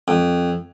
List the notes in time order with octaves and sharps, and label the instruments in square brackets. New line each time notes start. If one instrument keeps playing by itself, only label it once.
[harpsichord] F2